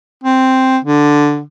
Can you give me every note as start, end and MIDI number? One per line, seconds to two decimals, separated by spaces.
0.24 0.78 60
0.85 1.41 50